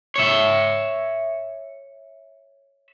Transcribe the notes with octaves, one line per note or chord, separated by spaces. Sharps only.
C#5 E5